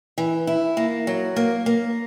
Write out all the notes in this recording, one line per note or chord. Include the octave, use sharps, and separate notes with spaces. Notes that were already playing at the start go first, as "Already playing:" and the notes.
E3
E4
A#3
F#3
A#3
A#3